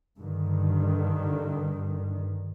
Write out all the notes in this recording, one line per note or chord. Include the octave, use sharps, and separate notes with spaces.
G2 D3 D#3